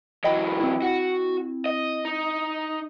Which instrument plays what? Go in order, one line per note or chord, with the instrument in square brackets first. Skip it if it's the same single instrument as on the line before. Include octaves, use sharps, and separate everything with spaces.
[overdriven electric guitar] E3 F#3 [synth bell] D#5 G5 B5
[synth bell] C4 E4
[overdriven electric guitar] F#4
D#5
D#4